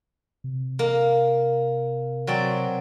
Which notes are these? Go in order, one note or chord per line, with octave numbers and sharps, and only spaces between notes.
C3
A#3
F#3 C4 D5